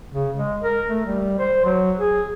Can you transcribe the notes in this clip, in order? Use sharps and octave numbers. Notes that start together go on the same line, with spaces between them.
C#3
G#3
A#4
A3
G3
C5
F#3
G#4